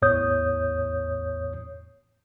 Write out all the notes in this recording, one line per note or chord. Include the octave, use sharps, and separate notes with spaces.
A1 E2 A2 C#5 D#6 G6